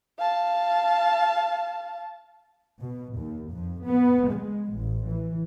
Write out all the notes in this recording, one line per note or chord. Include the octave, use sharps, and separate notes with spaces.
F5 A5
B2
D#2
F2
B3
G#3
A1
E3